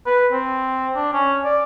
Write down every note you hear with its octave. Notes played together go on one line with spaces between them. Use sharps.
B4
C4
D4
C#4
D5